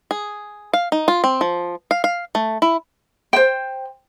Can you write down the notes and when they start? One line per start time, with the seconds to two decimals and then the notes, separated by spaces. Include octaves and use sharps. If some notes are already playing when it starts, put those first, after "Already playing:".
0.11 G#4
0.73 F5
0.92 D#4
1.08 F4
1.24 C4
1.41 F3
1.91 F5
2.04 F5
2.35 A3
2.62 E4
3.33 C5 G5